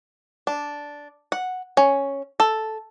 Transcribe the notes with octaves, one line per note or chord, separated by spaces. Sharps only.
D4
F#5
C#4
A4